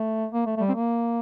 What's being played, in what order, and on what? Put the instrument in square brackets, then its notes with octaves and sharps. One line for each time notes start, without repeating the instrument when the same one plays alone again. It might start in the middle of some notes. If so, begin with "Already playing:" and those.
Already playing: [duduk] A3
A#3
A3
A3
G3
C4
A#3